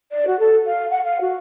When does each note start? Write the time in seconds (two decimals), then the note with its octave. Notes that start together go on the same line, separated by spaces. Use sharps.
0.13 D5
0.26 F#4
0.38 A4
0.67 F5
0.91 F#5
1.04 F5
1.21 F#4